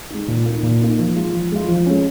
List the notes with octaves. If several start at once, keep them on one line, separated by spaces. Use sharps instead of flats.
G#3 D#4
A#2
A#3 D#4
A#2
A#3 D#4
F3
G#3 F4
F3
G#3 F4
F3
G#3 C#4